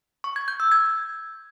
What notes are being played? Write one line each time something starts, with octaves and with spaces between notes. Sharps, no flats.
C#6
G#6
G6
E6
G#6